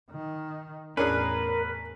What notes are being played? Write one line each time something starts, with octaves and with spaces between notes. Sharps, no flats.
D#3
E2 A2 C#4 D4 G#4 A#4 B4